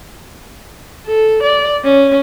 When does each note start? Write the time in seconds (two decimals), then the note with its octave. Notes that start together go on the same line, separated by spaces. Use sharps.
1.07 A4
1.43 D5
1.84 C#4